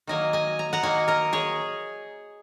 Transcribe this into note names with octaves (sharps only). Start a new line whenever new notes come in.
D#3 F#3 A#3 D#5 G#5
D#5 G#5
A#5
F#5 A#5
D#3 F#3 A#3 D#5 G#5
A#4 D#5
G#4 C#5